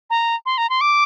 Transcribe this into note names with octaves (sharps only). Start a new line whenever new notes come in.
A#5
C6
A#5
C6
D6